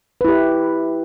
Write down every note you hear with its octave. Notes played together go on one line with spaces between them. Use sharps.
E4 G4 B4